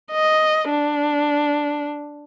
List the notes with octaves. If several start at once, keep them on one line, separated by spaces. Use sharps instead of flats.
D#5
D4